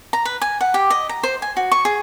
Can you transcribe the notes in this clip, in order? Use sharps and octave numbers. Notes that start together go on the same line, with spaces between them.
A#5
B4
G#5
F#5
G4
D#5
A#5
C5
G#5
F#4
C#6
G#4